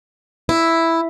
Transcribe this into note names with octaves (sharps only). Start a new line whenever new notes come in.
E4